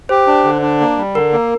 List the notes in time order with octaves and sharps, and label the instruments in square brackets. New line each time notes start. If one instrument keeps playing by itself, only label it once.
[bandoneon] G4 [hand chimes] C5
[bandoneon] D4
D3
D4
A#3
G3
[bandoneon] D3 [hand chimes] A#4
[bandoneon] A#3